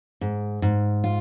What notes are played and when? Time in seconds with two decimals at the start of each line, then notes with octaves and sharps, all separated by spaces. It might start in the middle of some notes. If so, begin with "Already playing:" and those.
0.21 G#2
0.62 G#2
1.04 F4